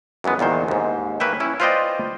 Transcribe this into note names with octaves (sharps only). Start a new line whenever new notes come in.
F#2 E3 G#3 B3
E2 A#2 D#3 C5
D#2 G#2
A#3 B4 C#5 E5 G5
C#4 E4
F4 B4 C5 D5 D#5 G5